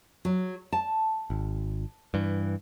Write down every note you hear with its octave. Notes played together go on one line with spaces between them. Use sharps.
F#3
A5
G#1
G2 E3